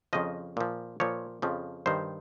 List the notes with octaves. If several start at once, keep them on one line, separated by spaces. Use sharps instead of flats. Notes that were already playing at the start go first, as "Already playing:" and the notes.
F2 C#3 F3 D#5
A#2 F3
A#2 F3 C#5
F2 C#3 F3
G2 D#3 C5